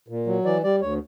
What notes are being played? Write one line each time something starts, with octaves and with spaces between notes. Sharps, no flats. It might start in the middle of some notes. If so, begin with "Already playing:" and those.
A#2
F#3
E3 D5
G3 D5
D2 C#5